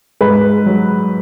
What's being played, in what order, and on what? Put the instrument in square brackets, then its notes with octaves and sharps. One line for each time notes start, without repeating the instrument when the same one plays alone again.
[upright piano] G#2 B4
F#3